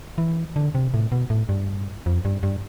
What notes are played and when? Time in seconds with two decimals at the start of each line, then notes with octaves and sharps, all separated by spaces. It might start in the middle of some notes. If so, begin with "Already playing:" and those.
0.18 E3
0.56 D3
0.75 C3
0.94 A2
1.12 B2
1.30 A2
1.49 G2
2.06 F2
2.25 G2
2.43 G2